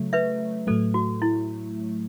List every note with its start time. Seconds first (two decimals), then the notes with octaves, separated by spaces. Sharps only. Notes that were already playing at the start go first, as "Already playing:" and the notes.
Already playing: C#3 F#3 A3
0.13 B4 E5
0.67 A2 F#3 A3 A4
0.94 F#4
1.22 E4